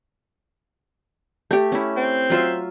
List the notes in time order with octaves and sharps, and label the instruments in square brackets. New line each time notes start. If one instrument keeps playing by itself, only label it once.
[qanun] A3 G4
C#4 E4
[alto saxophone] C4
[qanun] F#3 F4 E5